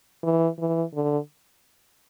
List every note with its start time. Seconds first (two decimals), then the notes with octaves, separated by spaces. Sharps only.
0.23 E3
0.59 E3
0.93 D3